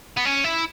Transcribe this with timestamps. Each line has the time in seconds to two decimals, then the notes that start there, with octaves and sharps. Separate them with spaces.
0.17 B3
0.25 C#4
0.44 E4